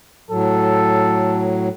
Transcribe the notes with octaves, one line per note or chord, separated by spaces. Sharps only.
A2 F#3 A4